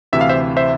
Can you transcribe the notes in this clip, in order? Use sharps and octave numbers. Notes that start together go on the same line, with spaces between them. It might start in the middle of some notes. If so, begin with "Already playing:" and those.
D2 C3 E3 E5
F5
C5 E5
C5 E5